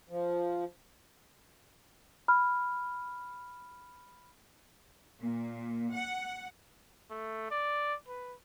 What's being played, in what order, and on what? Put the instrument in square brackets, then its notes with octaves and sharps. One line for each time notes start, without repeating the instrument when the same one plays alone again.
[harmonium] F3
[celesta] B5 F6
[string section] A#2
F#5
[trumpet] A3
D5
B4